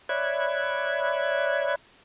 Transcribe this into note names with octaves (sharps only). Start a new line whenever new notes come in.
C#5 D5 E5 B5 F#6 G#6